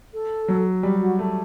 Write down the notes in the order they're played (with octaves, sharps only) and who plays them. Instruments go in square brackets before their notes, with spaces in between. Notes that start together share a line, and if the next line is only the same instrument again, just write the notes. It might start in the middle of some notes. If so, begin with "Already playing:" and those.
[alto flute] A4
[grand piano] F#3
[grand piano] G3 [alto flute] G4
[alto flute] F#4
[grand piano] A3